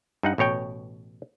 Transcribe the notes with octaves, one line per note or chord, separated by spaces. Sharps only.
G2 D#4 F#5
A1 B2 C#5 G5